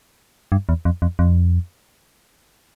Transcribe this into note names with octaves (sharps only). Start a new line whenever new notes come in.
G2
E2
F2
F2
F2